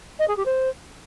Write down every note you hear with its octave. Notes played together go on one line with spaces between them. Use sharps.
D#5
G#4
G4
C5